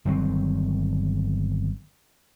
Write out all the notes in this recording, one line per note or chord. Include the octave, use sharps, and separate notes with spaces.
G1 D#3 F#3 C4